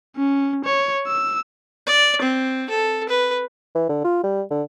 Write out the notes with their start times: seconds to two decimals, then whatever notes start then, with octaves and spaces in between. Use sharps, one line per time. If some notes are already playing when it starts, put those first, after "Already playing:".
0.17 C#4
0.65 C#5
1.07 E6
1.87 D5
2.22 C4
2.70 A4
3.09 B4
3.75 E3
3.89 D3
4.04 F4
4.24 G3
4.51 D3